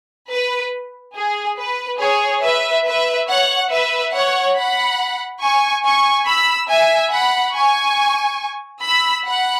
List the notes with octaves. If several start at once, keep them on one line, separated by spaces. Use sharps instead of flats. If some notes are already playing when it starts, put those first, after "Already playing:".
B4
G#4
B4
G#4 C#5
B4 E5
B4 E5
C#5 F#5
B4 E5
C#5 F#5
F#5 B5
G#5 C#6
G#5 C#6
B5 E6
E5 G#5
F#5 B5
G#5 C#6
B5 E6
F#5 B5